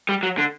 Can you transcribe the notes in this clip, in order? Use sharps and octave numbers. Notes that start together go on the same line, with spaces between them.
G3
F#3
D3